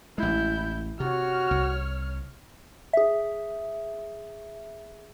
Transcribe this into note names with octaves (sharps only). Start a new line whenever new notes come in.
A1 G#3 E4 G6
C3 F#4 C#5 F6
C2
G#4 E5